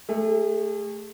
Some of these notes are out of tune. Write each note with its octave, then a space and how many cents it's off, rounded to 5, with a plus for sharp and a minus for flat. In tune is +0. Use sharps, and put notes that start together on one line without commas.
A3 +0 G#4 -40